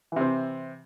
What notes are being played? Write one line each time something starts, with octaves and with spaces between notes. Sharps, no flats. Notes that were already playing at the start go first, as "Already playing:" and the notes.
C3 E3 C4